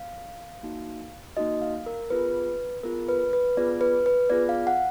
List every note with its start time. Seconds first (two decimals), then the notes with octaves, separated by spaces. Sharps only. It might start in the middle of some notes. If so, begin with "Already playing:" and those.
Already playing: F5
0.63 A#3 D#4 F#4
1.37 A#3 D#4 F#4 D#5
1.62 F5
1.86 A#4
2.10 B3 F4 G#4 B4
2.83 B3 F4 G#4 A#4
3.09 B4
3.33 B4
3.57 B3 F4 G#4 D5
3.81 B4
4.06 B4
4.30 B3 F4 G#4 D5
4.49 F5
4.67 F#5